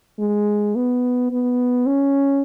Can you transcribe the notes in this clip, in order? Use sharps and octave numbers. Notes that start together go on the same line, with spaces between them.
G#3
B3
B3
C#4